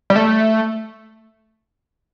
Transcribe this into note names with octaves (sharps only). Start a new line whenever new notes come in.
G3
A3